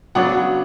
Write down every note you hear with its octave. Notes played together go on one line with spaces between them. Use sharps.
C#3 F#3 B3 D4 F#5